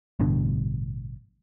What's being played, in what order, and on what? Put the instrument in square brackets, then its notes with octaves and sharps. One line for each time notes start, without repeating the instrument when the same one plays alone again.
[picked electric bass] A1 G2 B2 D3